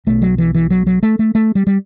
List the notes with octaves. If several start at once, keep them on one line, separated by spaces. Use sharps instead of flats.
B1 B2 A3
F#3
E3
E3
F#3
F#3
A3
A3
A3
G3
G3